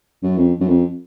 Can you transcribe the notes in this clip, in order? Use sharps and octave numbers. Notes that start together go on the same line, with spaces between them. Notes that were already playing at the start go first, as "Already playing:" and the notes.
F#2
F2
F#2
F2